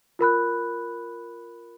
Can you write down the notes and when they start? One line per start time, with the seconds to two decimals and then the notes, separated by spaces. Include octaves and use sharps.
0.19 F4 A#4 B5 F#6